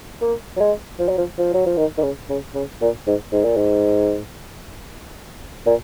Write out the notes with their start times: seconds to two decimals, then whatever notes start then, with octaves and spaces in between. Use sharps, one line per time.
0.21 A#3
0.56 F#3
0.60 G#3
0.99 F3
1.09 F#3
1.18 F3
1.38 F3
1.54 F#3
1.66 F3
1.77 D#3
1.98 D#3
2.03 C#3
2.29 C#3
2.55 C#3
2.81 A#2
3.07 G#2
3.32 G#2
3.45 A#2
3.57 G#2
5.66 A#2